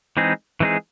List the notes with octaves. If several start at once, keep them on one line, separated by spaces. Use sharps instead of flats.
E3 G#3 C4 D#4 G#4
E3 G#3 C4 D#4 G#4